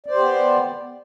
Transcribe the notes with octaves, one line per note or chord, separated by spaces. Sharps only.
B3 G4 C5 D5